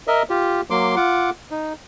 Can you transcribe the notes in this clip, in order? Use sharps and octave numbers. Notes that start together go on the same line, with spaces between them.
A#4 D#5 E5
F4 G4
F#3 A#3 C6 D6
F4 F#5 D6
D#4